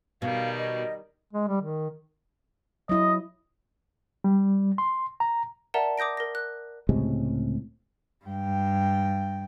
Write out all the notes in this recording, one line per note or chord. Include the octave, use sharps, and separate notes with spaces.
B2 D#3 G3 F5
D#5
G#3
G3
D#3
F#3 E4 D#5
G3
C6
A#5
A#4 D5 E5 F#5 A5 A#5
D6 D#6 G6 A#6 D7
A#4 A#6
F#6
C#2 A2 C3 G#3
G2 G5